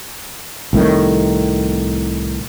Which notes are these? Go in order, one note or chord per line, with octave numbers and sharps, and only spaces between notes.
C2 A2 D#3